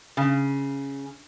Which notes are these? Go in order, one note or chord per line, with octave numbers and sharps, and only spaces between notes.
C#3